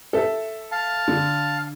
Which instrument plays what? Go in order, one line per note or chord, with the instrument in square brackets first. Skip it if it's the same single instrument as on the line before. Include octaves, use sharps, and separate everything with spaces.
[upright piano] A4 E5
[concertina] F5 A5
[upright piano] D3